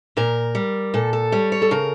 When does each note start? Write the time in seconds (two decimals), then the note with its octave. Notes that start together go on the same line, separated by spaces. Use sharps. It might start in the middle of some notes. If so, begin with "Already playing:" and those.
0.17 A#2 A#4
0.55 G3
0.94 A#2 A4
1.13 A4
1.32 G3 C#5
1.52 C#5
1.62 A4
1.71 C#3 A#4